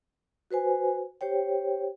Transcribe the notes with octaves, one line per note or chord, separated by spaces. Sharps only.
F#4 B4 C5 G#5
G4 C5 C#5 G5